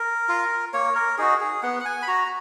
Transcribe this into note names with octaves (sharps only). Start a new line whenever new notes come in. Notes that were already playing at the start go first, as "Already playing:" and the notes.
Already playing: A#4
F4
A#3 C#5
A#4
D#4 F#4 G#4
G#4
B3 F#5
F#5
G#5
B5
F#4 A#5